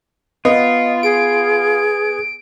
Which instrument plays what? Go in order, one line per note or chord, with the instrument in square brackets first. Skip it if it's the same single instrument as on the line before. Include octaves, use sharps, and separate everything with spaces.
[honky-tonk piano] B3 [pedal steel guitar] F4 [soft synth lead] D#5
[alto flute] G#4 [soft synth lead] D7